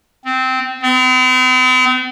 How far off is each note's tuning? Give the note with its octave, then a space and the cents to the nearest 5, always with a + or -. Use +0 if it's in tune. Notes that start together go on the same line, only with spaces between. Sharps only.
C4 -15
C4 -45